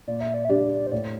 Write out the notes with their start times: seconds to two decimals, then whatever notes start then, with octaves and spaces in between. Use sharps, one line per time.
0.08 A#2 D5
0.21 E5
0.34 D5
0.45 E5
0.49 G3 D4 G4 D5
0.87 C5
0.92 A2 D5